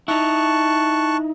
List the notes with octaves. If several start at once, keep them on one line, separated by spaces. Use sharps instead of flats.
D#4 E4 A5 C#6 F#6